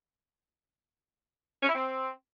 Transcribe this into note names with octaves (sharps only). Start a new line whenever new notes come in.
C#4
E4
C4